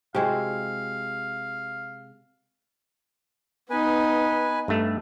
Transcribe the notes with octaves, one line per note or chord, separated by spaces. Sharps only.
C3 G#3 E4 F#4 G4 F5
B3 D#4 B4 G#5
G2 A3